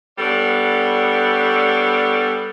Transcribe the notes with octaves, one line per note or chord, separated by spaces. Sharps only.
G3 B3 D4 A4 C#5